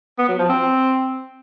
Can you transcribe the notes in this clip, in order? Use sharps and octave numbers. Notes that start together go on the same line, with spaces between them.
B3
F#3
F3
C4